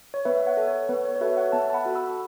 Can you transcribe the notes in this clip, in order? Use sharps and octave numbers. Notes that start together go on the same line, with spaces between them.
C#5
B3 B4 E5
E5
C#5 F#5
A4
C#5
B3 B4
C#5
C#5
F#4 A4 B4 E5
C#5 F#5
B3 E5 A5
A5
F#5 B5
F#4 A4
B5 E6